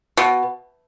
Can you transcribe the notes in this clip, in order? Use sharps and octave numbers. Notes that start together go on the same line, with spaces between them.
B2